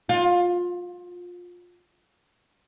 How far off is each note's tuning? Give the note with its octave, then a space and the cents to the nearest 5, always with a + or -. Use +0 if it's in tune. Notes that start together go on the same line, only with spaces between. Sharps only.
F4 +20